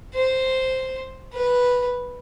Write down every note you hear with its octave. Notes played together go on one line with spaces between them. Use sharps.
C5
B4